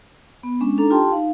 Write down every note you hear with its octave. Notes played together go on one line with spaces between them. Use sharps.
B3
G#3 C#4 D4
D4 D#4 A4 A#5
F4 G4 G5 A5 C6
D#4 F5